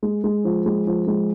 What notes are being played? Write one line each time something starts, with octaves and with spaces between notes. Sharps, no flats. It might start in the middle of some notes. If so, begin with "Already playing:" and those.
G#3
G#3
F3
G#3
F3
G#3